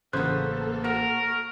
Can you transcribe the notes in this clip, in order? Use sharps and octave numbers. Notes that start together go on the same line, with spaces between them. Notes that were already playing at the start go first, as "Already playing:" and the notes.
A1 C#3 A#3 B3 A4 C5 F#6
F#4 A#4